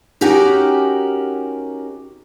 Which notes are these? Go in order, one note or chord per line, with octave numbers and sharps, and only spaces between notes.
C#4 D#4 F#4 G4 A#4